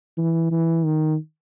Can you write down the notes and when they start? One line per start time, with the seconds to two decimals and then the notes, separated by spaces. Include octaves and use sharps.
0.18 E3
0.51 E3
0.85 D#3